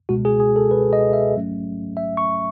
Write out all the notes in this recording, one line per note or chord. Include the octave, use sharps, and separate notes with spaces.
C#2 B2 G#3 F#4
G#4
G#4
A4
B4
D#5
E5
A1 G#2 F#3 A3 C#4
E5
C#6